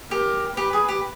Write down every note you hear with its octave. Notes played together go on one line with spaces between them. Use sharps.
G4 A#4
G4 B4
G#4
G4